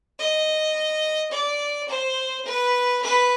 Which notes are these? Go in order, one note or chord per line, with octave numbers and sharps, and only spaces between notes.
D#5
D5
C5
B4
B4